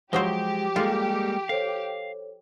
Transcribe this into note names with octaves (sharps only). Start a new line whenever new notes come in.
F3 F#3 G#3 G4 C5 G7
G3 G#3 A#3 F4 G#4 A4
A4 C5 C#5 F5